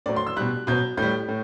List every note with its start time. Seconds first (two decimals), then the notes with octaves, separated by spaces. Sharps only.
0.06 A2 F#3 D5
0.16 C6
0.27 E6
0.36 B2 G3 F#6
0.67 B2 F#3 G6
0.97 A2 G3 G6
1.28 A2